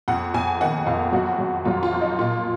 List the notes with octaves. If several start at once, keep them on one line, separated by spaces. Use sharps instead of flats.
F2 F#5
F2 G#5
D#3 F#5
F2 F5
F#2 F#4
F#2
F#2 F4
F4
F3
D#4
A#2 F4